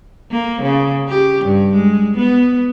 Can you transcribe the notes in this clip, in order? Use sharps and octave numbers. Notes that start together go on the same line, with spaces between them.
A#3
C#3
G4
G2
G#3
B3